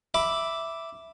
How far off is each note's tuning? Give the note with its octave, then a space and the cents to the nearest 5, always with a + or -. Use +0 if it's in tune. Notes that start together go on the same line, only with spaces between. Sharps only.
E5 +0 B5 +0 D6 +0